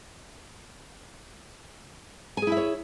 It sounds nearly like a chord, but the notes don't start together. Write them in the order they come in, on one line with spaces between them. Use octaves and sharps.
G#5 G#4 E4 E5 C#5